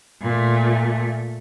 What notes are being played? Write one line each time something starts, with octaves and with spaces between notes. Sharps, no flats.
A#2 A3